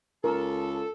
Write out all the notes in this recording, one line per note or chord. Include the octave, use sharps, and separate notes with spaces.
C#2 A4 A#4